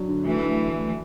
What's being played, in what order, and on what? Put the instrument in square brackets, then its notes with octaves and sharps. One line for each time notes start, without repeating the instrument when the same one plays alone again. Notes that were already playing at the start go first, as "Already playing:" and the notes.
Already playing: [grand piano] F#3 D4
D3
[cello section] E3 A3 [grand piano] F#4
[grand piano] D4